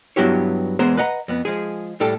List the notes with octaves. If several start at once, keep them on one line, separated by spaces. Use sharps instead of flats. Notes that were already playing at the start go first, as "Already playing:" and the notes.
G2 F#3 B3 E4 G4 C#5
E2 G#3 B3 G#4 C5 A#5
B4 D#5 F#5 A#5
F2 B3
F3 G#3 G#4
A2 G3 A4 G5 A5